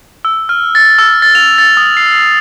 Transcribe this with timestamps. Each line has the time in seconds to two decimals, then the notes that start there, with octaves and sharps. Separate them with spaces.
0.25 E6
0.49 F6
0.75 A6
0.98 E6
1.22 A6
1.35 F7
1.58 A6
1.77 D#6
1.97 C7
2.12 C7